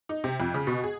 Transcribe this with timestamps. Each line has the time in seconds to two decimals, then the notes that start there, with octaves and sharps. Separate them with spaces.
0.09 D#4
0.24 C3
0.40 F2
0.54 C#3
0.67 B2
0.84 G#4